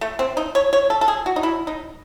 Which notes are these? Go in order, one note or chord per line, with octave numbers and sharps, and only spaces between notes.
A3
C4
D#4
C#5
C#5
A4
A4
G#4
F#4
D#4
E4
D#4